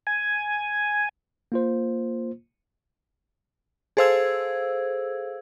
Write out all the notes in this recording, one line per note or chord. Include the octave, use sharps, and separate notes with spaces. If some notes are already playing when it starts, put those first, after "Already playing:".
G#5
A#3 F4 C5
G#4 A4 C5 F5 E6 G#6